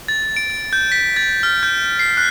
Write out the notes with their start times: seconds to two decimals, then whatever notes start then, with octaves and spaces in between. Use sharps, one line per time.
0.08 A6
0.36 D7
0.73 G6
0.92 B6
1.16 A6
1.43 F6
1.63 G6
1.99 C7
2.17 F#6